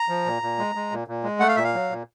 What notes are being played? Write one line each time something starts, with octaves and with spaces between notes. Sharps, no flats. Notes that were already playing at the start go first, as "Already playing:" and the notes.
Already playing: A#5
F3
A#2
A#2
G#3
G#3
A#2
A#2
G#3
A3 F#5
F5
A#2 E5
F5
F#3
A#2